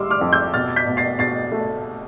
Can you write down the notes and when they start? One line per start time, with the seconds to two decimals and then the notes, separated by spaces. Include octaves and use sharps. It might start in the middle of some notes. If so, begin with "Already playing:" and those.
Already playing: G3 C6 D6 E6 F6
0.10 D6 F6
0.21 F2
0.33 E6 G6
0.54 B2 F6 A6
0.76 G6 B6
0.87 B2
0.97 A6 C7
1.19 B2 A6 C7
1.52 A3